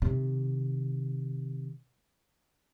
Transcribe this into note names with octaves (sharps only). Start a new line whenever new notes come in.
C3 D#3